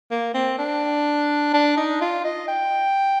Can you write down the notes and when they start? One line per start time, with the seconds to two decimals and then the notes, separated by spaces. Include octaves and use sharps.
0.11 A#3
0.34 C4
0.59 D4
1.54 D4
1.77 D#4
2.01 F4
2.24 D#5
2.48 G5